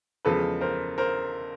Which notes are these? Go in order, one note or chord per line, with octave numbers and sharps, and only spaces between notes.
E2 C#3 F3 G#3 A4 B4
A#4 C5
A#4 C5